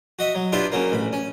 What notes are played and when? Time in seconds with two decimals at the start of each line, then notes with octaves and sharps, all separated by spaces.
0.19 F#4 D#5 E5
0.35 F#3
0.52 D4 E4 F4 G4 B4 E5
0.72 C#3 F#3 A#3
0.92 A1 B5
1.13 C#4